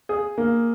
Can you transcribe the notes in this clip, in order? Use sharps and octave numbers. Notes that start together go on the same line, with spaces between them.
G#4
A#3